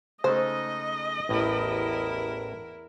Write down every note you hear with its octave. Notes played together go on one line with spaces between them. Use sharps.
C#3 G#3 A3 D#4 C5 D#5
A1 E2 A2 E4 A#4